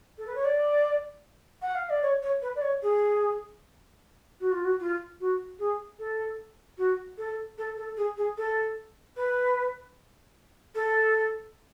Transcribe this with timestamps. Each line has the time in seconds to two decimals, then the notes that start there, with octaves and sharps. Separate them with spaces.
0.18 A4
0.27 B4
0.35 C#5
0.45 D5
1.62 F#5
1.75 F5
1.90 D5
2.02 C#5
2.22 C#5
2.42 B4
2.56 D5
2.62 C#5
2.82 G#4
4.40 F#4
4.52 F4
4.64 F#4
4.80 F4
5.20 F#4
5.59 G#4
5.99 A4
6.78 F#4
7.18 A4
7.58 A4
7.77 A4
7.97 G#4
8.17 G#4
8.37 A4
9.17 B4
10.75 A4